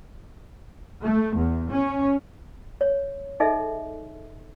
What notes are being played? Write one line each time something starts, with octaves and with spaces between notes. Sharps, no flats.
A3
E2
C#4
C#5
D#4 G#4 A4 D#5 E5